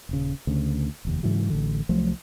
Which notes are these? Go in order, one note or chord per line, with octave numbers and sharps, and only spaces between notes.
D#1 C#3
D2 C#3
F1 D#2
G#2 C#3 E3 F#3
A1 D3
C2 F3 F#3 A3